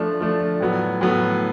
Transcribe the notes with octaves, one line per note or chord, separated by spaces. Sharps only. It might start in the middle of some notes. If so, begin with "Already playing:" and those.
Already playing: F3 A3 D4
F3 A3 D4
A2 F#3 B3
A2 F#3 B3